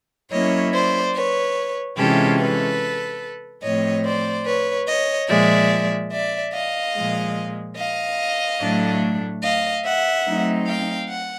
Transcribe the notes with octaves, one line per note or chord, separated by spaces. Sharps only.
F#3 A#3 C#4 E4 C#5 D#5
C5 D5
B4 C#5
C3 E3 G#3 C#4 F4 G4 A4
A4 B4
A2 F3 A3 C4 C#5 D#5
C5 D5
B4 C#5
C#5 D#5
A#2 F3 G#3 D5 E5
D5 E5
D#5 F5
A#2 F3 G#3
D#5 F5
A2 F#3 A3 D4
D#5 F5
E5 F#5
F#3 A3 C4 D#4
F5 G5
F#5